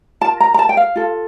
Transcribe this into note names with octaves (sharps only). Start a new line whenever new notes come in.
F4 A#4 A5
A#5
A#5
A5
G5
F5
F4 A4